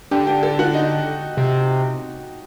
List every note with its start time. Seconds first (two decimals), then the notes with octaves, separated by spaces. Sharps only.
0.11 D3 G4
0.27 G4
0.43 A4
0.59 F#4
0.74 D#4
1.37 C3